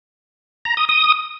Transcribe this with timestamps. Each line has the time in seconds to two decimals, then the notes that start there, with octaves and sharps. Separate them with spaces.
0.65 A#5
0.77 D#6
0.89 D#6